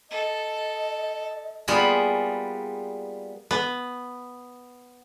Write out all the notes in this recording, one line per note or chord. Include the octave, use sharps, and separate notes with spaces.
A4 D#5
G3 A#3 B3 F4 G#4 B5
B3